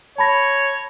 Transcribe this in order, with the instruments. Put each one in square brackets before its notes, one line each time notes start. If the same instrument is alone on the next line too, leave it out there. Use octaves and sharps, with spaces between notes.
[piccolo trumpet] C#5 [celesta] A5 B5 A#6